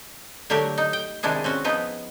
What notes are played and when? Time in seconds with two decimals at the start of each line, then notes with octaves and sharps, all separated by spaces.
0.50 D3 F#3 A3 G4 A#4
0.78 D#4
0.93 G5
1.23 C3 D#3 G#3 D4 E4 G#4
1.44 C4 C#4 F#4
1.64 F3 B3 D#4 E4